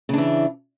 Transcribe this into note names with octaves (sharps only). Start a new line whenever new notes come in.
C#3 E3 D4